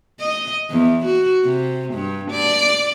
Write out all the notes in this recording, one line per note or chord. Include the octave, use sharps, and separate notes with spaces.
D#5
E2
F#4
C3
G2
D5